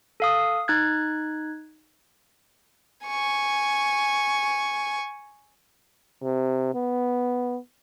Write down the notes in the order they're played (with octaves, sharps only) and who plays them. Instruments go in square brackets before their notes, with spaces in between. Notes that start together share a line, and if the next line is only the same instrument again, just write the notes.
[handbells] A4 F5 D#6
D#4 F#6 G#6
[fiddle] G#5 C#6
[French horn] C3
B3